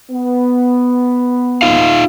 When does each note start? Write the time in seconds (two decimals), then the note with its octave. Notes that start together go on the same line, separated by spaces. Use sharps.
0.11 B3
1.62 D#4 F4 F5